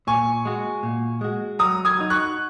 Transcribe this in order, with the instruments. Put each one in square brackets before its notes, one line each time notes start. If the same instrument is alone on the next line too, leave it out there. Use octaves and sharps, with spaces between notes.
[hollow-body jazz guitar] A#2 [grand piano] G#5 C#6
[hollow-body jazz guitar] G#3 F#4
A#2
G#3 F#4
[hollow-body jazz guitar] F#3 [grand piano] A#5 D#6
[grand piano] D#6 G#6
[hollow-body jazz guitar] D#4 F#4
[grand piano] C#6 F#6